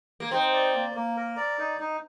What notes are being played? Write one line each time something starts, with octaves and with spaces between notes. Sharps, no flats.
A#3
C4 D#4
D5
A#3
A#3
A#4
D5
D#4
D#4